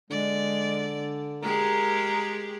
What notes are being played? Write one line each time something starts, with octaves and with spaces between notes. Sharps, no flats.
D3 G#3 D5
G#3 G4 G#4 A#4